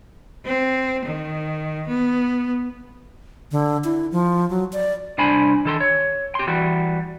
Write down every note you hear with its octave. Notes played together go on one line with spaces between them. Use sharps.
C4
D#3
B3
D3
E4
F3
F#3
D5
C2 D4 C5 G#5 B5
D#3 A4 C6
C#5
G4 C6
E3 G3 F#4